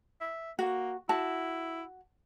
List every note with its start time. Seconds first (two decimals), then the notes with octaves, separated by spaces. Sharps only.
0.21 E5
0.59 A#3 F#4
1.09 E4 F#4 A5